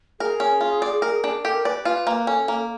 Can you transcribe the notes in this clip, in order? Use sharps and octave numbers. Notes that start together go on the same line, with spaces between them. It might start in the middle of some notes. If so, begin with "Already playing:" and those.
G#4 A#4
C#4
F4
D5
A#4
D4
G4 A4
A#4
B4 D5
F4 B4
A#3
C#4 A4
A#3